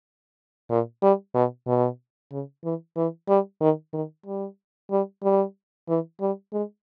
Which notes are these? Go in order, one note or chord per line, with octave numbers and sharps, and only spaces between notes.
A#2
G3
B2
B2
C#3
E3
E3
G3
D#3
D#3
G3
G3
G3
E3
G3
G#3